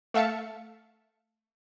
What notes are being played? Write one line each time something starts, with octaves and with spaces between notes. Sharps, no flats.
A3 E5 F5 A5 C#7